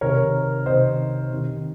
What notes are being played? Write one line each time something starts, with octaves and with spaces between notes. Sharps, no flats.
C3 D#3 A#4 C#5
C3 D#3 C5 D#5
C3 D#3